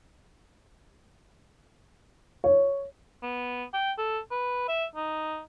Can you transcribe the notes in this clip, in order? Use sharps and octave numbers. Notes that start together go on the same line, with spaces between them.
C#5
B3
G5
A4
B4
E5
D#4